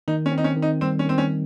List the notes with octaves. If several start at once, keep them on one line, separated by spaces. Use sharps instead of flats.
D#3 D#4
C#4
C4
D#4
C#4
D#3
D#4
G3 C4
C#4
D#3 C4
C#4